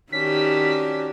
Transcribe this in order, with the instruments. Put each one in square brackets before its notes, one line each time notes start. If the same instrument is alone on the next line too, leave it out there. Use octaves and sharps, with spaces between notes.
[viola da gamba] D#3 F#4 G4 [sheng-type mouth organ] C#4 D4 [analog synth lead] B6